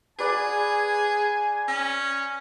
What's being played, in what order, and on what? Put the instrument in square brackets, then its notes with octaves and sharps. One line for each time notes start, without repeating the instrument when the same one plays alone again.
[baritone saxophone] G#4 [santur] B4 D5 F#5 [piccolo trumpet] G#5
[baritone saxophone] C#4